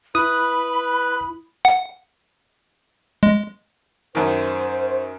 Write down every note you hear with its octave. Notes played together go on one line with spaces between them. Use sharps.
E4 B4 B5 D#6 F#6
F#5
G#3
F#2 D#3 C5